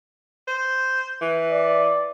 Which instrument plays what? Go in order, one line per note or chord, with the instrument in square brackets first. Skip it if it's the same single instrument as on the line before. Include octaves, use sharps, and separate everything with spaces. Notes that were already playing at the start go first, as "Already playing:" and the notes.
[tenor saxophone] C5
E3
[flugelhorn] D5